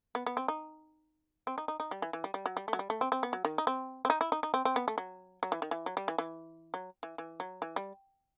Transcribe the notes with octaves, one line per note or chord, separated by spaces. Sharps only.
B3
B3
C4
D#4
C4
D#4
D#4
D#4
G3
E3
E3
G3
G3
F#3
G3
A3
F#3
G3
A3
C4
C4
B3
F#3
D#3
D#4
C4
C4
D#4
E4
D#4
D#4
C4
C4
B3
A3
F#3
F#3
E3
D#3
E3
F#3
G3
E3
E3
F#3
E3
E3
F#3
E3
G3